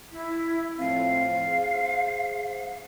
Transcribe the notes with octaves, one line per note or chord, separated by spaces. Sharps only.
E4
A2 F3 C4 F5
G#4 C5